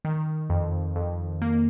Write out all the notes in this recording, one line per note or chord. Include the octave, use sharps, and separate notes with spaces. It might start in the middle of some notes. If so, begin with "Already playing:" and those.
D#3
F2
F2
A#3